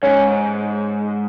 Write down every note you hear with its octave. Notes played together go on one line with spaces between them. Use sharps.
G#2 C#4